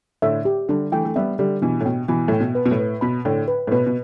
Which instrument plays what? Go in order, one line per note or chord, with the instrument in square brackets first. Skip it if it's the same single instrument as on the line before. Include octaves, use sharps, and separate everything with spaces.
[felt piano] A2 D3 [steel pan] E5
[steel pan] G4
[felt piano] D3 G3 [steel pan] D4
[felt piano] E3 A3 [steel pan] G5
[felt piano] A3
[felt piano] G3 B3 [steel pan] E5
[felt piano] D3 G3 [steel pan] G4
[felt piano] B2 E3 [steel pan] D4
[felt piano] A2
[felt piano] B2 [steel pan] G5
[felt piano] B2 E3 [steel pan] B5
[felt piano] A2 [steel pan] G5
[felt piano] B2
[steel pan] B4
[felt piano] B2
A2
[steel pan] B4
[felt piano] B2 [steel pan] B5
[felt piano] A2 D3 [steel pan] G5
[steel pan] B4
[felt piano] A2
[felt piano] B2 [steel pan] B4
[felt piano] B2